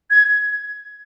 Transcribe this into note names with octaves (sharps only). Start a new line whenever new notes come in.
G#6